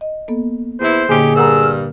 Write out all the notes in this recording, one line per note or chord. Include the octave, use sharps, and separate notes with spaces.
D#5
A#3 B3 A4
E2 E3 E4 C5
A#2 D3 A#3 C#4 D#4 G4 G#4
G2 A#4 F#5 A#5 E6
F6